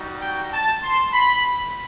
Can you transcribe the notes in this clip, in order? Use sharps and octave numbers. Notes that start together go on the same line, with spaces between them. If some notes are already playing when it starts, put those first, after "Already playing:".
Already playing: G3 D#4 F#4
G5
A5
C6
B5